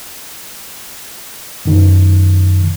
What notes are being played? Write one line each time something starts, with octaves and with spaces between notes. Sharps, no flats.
F#2 D#3